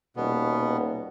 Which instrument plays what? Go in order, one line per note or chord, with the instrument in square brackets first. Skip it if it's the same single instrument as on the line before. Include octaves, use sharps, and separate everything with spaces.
[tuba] D#1 [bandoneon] B2 B3